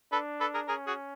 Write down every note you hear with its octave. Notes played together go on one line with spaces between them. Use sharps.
D4 A4 B4
A4 B4
G#4 A#4
C#4 G#4 A#4
F#4 G#4